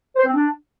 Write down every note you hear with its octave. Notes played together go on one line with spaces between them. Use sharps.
C5
C4
D4